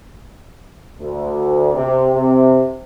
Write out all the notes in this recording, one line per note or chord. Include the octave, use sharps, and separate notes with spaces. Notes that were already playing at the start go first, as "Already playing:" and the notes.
D2
C3
C3